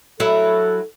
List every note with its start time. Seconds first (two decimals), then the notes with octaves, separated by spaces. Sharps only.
0.20 F#3 E4 A4